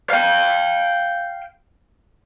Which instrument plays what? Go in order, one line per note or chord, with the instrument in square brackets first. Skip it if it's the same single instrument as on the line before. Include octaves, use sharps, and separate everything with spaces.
[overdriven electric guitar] F5 G5